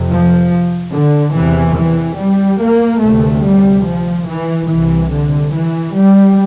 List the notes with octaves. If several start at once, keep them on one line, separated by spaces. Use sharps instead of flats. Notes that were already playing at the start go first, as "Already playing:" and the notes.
Already playing: F2 C3
F3
D3
E2 C3 E3
E3
G3
A#3
D2 C3 A3
G3
F3
E3
C2 C3 E3
D3
E3
G3